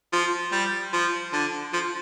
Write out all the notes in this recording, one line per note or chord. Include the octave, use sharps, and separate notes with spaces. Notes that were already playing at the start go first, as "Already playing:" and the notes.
F3
G3
F3
D3
F3